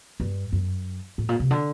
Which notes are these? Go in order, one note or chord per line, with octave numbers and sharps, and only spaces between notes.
G2
F#2
A2
A#2
C3
D3